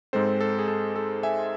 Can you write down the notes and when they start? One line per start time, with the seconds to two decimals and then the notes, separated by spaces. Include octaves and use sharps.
0.13 G#2 G#3 C4 A4 C5
0.41 A4
0.59 G#4
0.68 A4
0.96 A4
1.23 E5 G#5